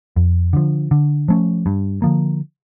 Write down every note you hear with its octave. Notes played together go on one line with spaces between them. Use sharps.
F2
D3 F3
D3
F3 A3 C#4
G2
D3 F3 A#3